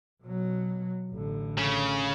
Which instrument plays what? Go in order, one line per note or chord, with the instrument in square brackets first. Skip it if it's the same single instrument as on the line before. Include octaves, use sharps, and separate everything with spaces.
[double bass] B2 F#3
A1 D3
[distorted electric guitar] C#3